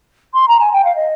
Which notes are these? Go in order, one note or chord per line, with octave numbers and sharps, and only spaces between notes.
C6
A#5
G#5
G5
F5
D#5